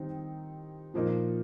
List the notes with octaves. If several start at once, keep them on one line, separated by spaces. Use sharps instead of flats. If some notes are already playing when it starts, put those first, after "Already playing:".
Already playing: D#3 G3 C4 D#4
A#2 F3 A#3 D#4